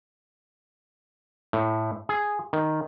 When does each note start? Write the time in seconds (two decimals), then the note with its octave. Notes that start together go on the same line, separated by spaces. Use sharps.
1.53 A2
2.09 G#4
2.53 D#3